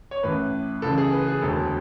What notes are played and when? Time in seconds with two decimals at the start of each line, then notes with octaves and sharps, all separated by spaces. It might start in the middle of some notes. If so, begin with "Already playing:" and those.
0.11 C#5
0.23 A1 A2 E3 B4
0.82 C#2 C#3 E3 A4
0.98 G#4
1.13 B4
1.27 G#4
1.42 E1 D2 D3 A4